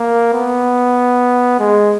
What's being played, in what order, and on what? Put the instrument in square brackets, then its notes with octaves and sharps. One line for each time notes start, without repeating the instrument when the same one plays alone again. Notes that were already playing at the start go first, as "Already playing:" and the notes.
Already playing: [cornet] A#3
B3
G#3